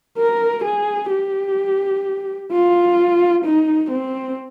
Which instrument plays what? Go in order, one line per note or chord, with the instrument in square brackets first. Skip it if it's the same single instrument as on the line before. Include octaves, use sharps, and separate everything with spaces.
[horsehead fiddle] A#4
G#4
G4
F4
D#4
C4